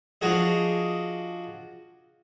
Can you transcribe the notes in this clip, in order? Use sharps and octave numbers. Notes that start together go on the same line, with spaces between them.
F3 D4 F#4 G#4 D#5